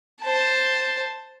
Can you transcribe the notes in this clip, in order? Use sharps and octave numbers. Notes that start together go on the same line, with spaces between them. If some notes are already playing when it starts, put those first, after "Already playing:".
C5 A5